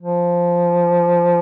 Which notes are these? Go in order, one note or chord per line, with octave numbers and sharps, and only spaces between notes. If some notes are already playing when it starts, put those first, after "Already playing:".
F3